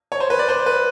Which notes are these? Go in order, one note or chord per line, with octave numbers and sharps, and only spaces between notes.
C#5
C5
B4
D5
C5
B4